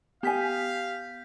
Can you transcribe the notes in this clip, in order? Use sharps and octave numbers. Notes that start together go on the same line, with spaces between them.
B3 G4 F5 G#5 G6 B6